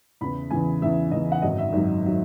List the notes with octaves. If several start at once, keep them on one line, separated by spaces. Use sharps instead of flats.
E2 C#3 E3 B5
E2 C#3 E3 G#5
E2 C#3 E3 E5
E2 C#3 E3 D#5
F#5
G#1 F#2 D#3 F#3 D#5
E5
G#1 F#2 D#3 F#3
D#3 F#3